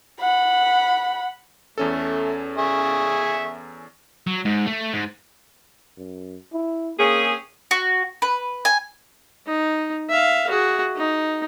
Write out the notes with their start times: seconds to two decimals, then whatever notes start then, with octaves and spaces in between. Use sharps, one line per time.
0.20 F#5 B5
1.78 E2 A3 C#4 A4
2.58 G#4 E5 C#6
4.27 F#3
4.45 G#2
4.66 A3
4.93 G#2
5.97 F#2
6.53 E4
6.99 A#3 C4 C#4 G#4
7.71 F#4
8.22 B4
8.65 G#5
9.47 D#4
10.10 E5 F5
10.50 F#4 G#4
10.96 D#4